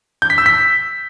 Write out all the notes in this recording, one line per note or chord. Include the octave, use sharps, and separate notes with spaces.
G6
B6
E6
B6